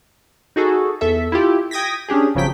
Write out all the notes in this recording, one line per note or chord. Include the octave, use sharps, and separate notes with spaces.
D#4 F#4 G#4 A4
E2 A4 E5
E4 F4 G4
G5 D#6 G#6 A#6 B6
C#4 D4 G4 G#4
G#1 C#3 F3 F#3 G5 B6